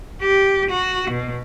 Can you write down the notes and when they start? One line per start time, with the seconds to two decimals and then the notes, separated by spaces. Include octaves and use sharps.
0.21 G4
0.71 F#4
1.11 B2